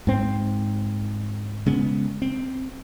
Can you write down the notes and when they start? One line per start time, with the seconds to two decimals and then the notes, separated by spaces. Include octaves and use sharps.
0.07 G#2 C4
1.66 C#3 G#3 B3
2.22 C4